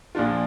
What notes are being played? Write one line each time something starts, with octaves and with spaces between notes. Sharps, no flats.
A#1 A#2 F3 D4 F4